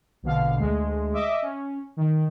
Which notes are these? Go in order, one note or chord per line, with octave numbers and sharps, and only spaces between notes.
A#1 B2 D3 F5
D2 G#3
D#5 E5 D6
C#4
D#3